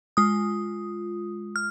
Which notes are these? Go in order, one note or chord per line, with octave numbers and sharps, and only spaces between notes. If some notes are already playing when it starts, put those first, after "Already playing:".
G#3 F4 D#6
F6